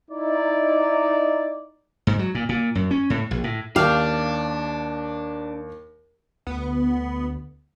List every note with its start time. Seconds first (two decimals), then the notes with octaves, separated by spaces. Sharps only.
0.11 D#4 E4 D5
2.07 G#2
2.19 F#3
2.35 A#2
2.49 A#2
2.75 F#2
2.91 C#4
3.10 A2
3.31 A#1
3.44 A2
3.76 D#2 D4 G4 F5
6.47 D2 B3